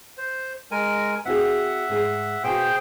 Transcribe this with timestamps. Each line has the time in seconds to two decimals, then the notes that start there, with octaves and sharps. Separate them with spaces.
0.18 C5
0.71 G#3 A#4 G#5
1.25 C4 F#4 G#4 E5 F#5
1.89 G#2 G#4
2.44 B2 A#3 F#4 G#4 C5 G5